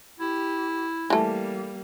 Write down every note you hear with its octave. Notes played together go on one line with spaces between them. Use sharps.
E4 G4
E3 G3 A3 A#3